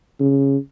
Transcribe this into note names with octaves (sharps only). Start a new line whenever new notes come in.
C#3